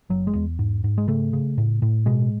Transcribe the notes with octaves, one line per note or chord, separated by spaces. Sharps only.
F#1 F#3
G#3
E2
G#2
G#2
G#3
C#3 A3
C#3
A2
A2
B2 G#3